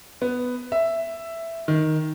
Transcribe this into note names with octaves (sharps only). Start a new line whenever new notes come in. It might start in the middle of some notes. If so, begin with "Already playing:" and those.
B3
E5
D#3